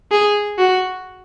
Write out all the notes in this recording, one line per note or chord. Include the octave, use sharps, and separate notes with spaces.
G#4
F#4